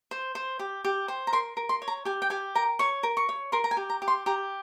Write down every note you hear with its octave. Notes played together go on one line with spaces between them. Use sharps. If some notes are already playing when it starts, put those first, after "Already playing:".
C5
C5
G4
G4
C5
A#5
A#4 C6
A#4
C6
C#5
A#5
G4 G#5
G5
G4 G#5
A#4 A#5
C#5 C#6
A#4
C#6
C#5
A#4 C6
A#5
G#5
G4
A#5
G4
C6
G4 A#5